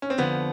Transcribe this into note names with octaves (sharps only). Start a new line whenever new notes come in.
C#4
C4
F2 D3 F3 B3